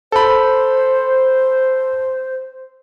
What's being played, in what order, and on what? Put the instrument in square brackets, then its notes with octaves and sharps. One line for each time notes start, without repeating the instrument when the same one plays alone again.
[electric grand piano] A4 B5 [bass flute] C5